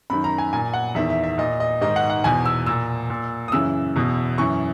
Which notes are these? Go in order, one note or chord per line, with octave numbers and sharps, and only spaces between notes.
F#2 D#3 B5
A#5
G#5
A#2 G#5
F#5
E2 D#3 E5
E5
E5
A#2 D#5
D#5
G#2 D#3 D#5
F#5
F#5
E2 B2 G#5
E6
A#2 E6
A#2
D#6
F#2 C#3 E3 E6
E2 B2
F#2 E3 C#6